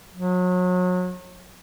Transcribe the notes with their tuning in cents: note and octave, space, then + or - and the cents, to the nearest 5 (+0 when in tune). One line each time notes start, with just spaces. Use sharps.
F#3 -35